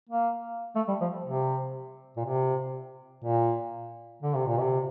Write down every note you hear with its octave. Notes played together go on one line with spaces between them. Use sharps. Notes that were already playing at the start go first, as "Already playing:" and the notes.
A#3
A3
G3
F3
C3
A#2
C3
A#2
D3
C3
A#2
C3